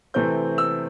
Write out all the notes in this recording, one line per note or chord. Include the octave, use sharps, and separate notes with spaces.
C3 E3 A3 C4 G6
E6